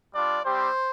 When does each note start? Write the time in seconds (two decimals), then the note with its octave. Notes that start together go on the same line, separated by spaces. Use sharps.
0.15 G3 D4 F4 D5
0.45 G3 C4 G4 C5